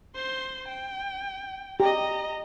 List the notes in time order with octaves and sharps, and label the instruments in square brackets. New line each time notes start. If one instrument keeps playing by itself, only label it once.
[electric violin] C5 C6
G5
[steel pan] G4 [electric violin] D#5 A#5